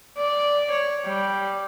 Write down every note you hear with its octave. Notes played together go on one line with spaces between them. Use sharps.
D5
C#5
G3